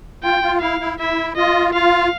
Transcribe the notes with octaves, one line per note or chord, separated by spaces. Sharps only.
F4 G5
F4
E4 F5
E4
E4 E5
F4 D#5
F4 F5